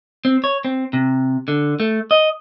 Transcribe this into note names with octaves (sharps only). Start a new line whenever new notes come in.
C4
C#5
C4
C3
D3
A3
D#5